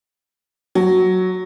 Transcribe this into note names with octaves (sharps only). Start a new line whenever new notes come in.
F#3